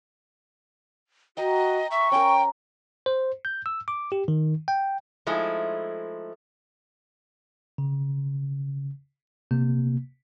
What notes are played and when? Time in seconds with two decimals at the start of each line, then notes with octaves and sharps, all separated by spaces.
1.37 F#4 D#5 G5 A#5
1.91 E5 C#6
2.12 C#4 A#4 G5
3.06 C5
3.45 G6
3.66 E6
3.88 D6
4.12 G4
4.28 D#3
4.68 G5
5.27 F3 G#3 A3 D#4 E4
7.78 C#3
9.51 C3 A#3